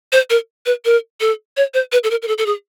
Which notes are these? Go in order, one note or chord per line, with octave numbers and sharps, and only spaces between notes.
C5
A#4
B4
A#4
A4
C#5
C5
B4
A4
A#4
A#4
A4
A4
G#4